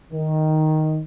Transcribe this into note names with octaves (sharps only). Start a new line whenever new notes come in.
D#3